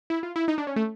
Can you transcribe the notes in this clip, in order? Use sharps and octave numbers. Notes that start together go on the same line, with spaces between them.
E4
F4
E4
D#4
D4
C#4
A3